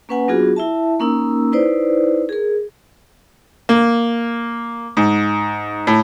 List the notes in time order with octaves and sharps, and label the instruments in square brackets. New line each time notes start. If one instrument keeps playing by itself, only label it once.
[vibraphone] A#3 C#4 B4 F#5 G#5
F#3 B3 D4 F4 F#4 G#4
E4 E5 A5
A#3 C#4 D#4 A#4 E6
D#4 E4 B4 C5 D5
G#4 A#4
[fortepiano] A#3
G#2
A2